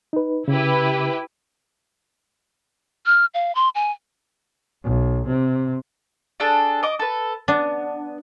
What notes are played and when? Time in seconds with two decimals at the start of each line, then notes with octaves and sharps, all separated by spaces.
0.13 D#4 B4
0.48 C#3 E4 G4 B4
3.06 F6
3.34 F5
3.55 C6
3.75 G#5
4.84 B1
5.27 C3
6.40 D4 G#4 A4
6.83 D#5 D6
6.99 A4 B4
7.48 B3 D4